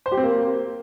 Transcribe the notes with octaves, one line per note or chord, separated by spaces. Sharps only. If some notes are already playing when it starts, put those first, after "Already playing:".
C5
G4
C4
A#3